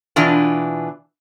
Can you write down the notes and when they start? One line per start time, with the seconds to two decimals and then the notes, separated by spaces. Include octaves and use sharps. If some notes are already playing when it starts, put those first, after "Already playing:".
0.16 B2 E3 D4 F4